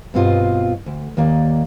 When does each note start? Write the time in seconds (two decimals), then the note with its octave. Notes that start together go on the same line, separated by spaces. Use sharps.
0.14 G2 B2 C4 F4 D#5
0.86 D2
1.17 D#2 D#3 A#3 D5 D#5